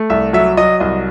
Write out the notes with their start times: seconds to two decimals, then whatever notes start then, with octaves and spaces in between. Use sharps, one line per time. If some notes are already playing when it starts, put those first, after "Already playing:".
Already playing: A3
0.10 C2 E5
0.33 F#3 E5
0.57 F#3 D#5
0.80 C2 D#5